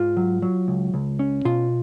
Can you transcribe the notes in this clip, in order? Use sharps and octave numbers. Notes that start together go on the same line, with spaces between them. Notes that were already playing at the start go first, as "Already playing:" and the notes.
Already playing: G#2 F4
F#3
F#3
C#2
C#2
C#4
B2 F4